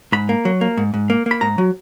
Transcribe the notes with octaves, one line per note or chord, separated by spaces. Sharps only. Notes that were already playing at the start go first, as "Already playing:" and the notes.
G#2 B5
A#3
F#3
A#3
G#2
G#2
A#3
A#3 B5
G#2 A#5
F#3